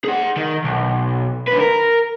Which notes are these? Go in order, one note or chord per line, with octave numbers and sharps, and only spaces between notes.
G#4 F#5
D#3
B1
D3 B4
A#4